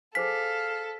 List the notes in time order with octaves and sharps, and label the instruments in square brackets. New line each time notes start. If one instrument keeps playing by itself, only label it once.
[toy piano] G#4 C5 G#5 [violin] A4 [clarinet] F5 [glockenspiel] B6